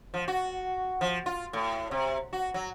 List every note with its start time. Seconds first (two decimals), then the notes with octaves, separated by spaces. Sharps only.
0.14 F3
0.28 F#4
1.01 F3
1.26 F4
1.53 A2
1.91 C3
2.33 F#4
2.54 F#3